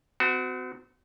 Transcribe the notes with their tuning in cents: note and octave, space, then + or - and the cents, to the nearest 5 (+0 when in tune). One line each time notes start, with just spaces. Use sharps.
C4 -40 F#4 +0